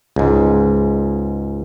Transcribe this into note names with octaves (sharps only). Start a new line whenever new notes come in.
C#2 G#2